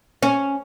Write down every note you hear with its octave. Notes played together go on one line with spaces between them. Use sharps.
C#4